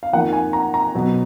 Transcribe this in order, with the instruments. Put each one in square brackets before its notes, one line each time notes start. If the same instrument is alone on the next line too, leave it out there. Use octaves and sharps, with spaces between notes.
[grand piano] F5
F2 D#3 A#3 F#5
G#5
A#5
A#5
B2 F#3 B3